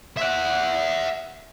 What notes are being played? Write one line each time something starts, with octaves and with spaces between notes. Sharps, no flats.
E5 F#5